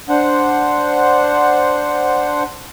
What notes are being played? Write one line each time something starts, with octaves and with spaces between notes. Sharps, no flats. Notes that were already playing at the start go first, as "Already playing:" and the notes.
D4 C5 F#5